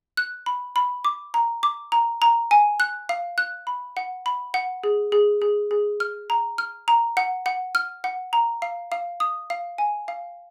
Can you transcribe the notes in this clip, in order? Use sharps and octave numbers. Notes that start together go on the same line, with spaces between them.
F#6
B5
B5
D6
A#5
D6
A#5
A#5
G#5
F#6
F5
F#6
B5
F#5
B5
F#5
G#4
G#4
G#4
G#4
F6
A#5
F6
A#5
F#5
F#5
F6
F#5
A#5
F5
F5
D#6
F5
G#5
F5